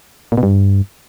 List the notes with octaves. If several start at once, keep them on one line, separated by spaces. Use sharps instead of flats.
A#2
B2
G2